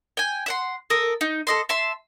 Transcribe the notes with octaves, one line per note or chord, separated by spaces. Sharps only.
G5 G#5
E5 F#5 C6
A4 A#4 D#6
D#4
A4 D#5 C6
E5 A5 C6